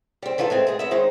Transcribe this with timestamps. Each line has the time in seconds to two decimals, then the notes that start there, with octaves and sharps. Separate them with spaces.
0.22 G3 C4
0.38 D#3 E3 A3 F4 A4
0.50 G#3 A3 C4
0.67 G#3 G#4
0.79 G#3 B3 E5
0.91 D#3 G#3 D#4 C5